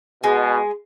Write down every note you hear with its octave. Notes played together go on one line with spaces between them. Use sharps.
B2 G#3